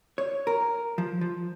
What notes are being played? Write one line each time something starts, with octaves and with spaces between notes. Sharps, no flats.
C#5
A#4
F3
F3